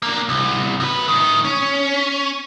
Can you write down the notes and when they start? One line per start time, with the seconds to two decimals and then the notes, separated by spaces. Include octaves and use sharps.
0.03 A#3 D4
0.29 C2
0.80 F#2 B4
1.08 A2 D#3
1.45 C#4